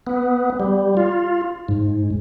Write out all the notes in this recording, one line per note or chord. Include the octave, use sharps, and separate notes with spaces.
B3
G3
F4
G#2